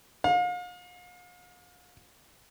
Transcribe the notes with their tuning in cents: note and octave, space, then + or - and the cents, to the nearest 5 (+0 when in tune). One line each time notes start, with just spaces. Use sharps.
F5 +40